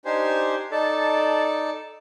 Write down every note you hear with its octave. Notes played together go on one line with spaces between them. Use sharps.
D4 D#4 G4 C5 G#5 C6
D#4 A4 D5 A5